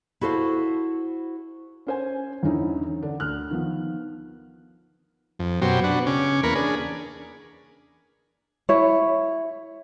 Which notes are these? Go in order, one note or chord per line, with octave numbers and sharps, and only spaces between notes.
E4 F#4 A4 C5 F5
C#4 C5 G#5
E2 D3 C#4 D#4 E4
D3 D4
D2 F6 F#6
D#3 F3 B3
F2
F#2 B2 F#3 G4 C5
B3 D4 F#4
C#3 C#4 D6
E2 A#3 A#4 B4 B5 C#6
D4 G#4
E4 C#5